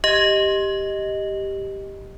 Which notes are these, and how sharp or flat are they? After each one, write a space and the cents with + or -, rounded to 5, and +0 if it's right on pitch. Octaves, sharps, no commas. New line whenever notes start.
G4 +0 D#5 +0